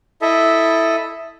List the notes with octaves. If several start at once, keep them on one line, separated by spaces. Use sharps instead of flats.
E4 A4 D#5 E5